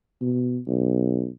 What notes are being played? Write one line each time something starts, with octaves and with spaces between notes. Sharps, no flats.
B2
B1